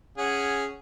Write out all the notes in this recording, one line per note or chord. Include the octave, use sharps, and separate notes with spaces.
C#4 G#4 F#5